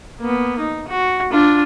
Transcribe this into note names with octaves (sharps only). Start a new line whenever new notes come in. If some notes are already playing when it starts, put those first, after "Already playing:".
A#3 B3
D#4
F#4
D4 F4